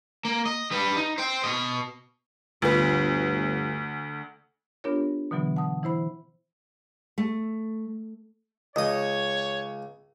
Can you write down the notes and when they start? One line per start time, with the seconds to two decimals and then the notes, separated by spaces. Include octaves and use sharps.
0.25 A#3
0.45 D#5
0.71 G3 B4
0.97 D#4
1.18 C5 G5
1.44 B2 D#5
2.62 G1 D2 B3 F4 B4
4.84 B3 D4 F4 G4 A#4 C#5
5.31 B2 D3 E3 F#3 B3
5.56 F#5 A5 D#6
5.83 E3 E4 C5 B5
7.18 A3
8.76 C#2 C#5 D#5 D#6